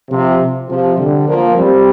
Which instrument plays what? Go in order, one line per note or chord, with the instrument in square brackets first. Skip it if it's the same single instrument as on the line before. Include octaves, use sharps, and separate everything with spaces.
[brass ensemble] C3 F3
C3 F3
D3 G3
F3 A#3
G3 C4